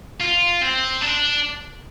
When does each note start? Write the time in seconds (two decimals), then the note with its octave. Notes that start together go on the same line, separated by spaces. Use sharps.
0.20 F4
0.61 C4
1.01 D4